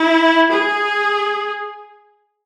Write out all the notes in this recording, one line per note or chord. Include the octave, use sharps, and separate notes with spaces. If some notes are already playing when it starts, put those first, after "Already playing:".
Already playing: E4
G#4